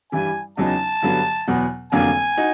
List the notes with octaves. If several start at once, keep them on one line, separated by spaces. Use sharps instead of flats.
G2 E3 G3 G#5
E2 C#3 F#3 B3 D#4 A5
G2 D3 F#3 B3
E2 B2 F#3 B3
F1 F2 D3 F#3 A#3 G#5
D#4 F#4